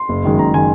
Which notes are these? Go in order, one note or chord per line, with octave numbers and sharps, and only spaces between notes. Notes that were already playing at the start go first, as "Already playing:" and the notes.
Already playing: C6
F#1
F#2 D#3 G#3
F#1 A#5
D#3 G#3 G#5